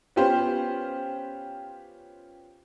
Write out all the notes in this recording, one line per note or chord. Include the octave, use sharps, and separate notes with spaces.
B3 C#4 F4 G4 C5